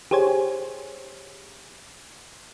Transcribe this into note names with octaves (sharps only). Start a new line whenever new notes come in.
G4 G#4 C5 C#5 G#5